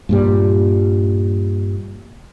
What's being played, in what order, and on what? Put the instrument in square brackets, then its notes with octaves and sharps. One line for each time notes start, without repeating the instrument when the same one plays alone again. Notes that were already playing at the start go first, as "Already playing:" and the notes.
[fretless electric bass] G2 A#2 G3